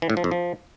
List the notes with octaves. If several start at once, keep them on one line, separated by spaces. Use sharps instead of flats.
E3
A2
F3
F2
F3